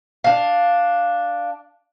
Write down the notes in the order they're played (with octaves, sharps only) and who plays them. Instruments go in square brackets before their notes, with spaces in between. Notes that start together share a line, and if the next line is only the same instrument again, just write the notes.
[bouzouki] D4 F5